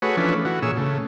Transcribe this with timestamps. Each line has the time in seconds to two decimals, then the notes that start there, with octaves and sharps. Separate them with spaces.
0.02 A3 F#4 G#4 B4 C#5
0.17 E3 F3 A3 C#4 D4 B4
0.45 E3 F#4
0.62 A#2 G#4 C#5 E6
0.77 C#3 A3